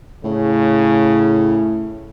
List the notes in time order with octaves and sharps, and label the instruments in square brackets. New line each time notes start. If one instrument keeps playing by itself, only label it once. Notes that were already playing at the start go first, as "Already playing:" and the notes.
[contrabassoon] A2 [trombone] C#3